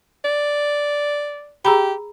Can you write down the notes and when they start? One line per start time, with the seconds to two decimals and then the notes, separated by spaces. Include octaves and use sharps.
0.24 D5
1.65 G4 G#4 A#5 B5